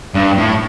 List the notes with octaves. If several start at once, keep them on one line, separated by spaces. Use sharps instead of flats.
G2
A2